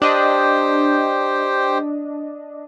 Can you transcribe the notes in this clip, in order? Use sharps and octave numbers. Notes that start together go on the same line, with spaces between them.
D4 G4 C5 D#5 G5